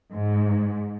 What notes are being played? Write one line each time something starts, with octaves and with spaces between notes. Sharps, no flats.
G#2